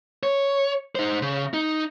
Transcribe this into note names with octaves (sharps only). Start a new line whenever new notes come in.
C#5
D#4 C5
C#3
D#4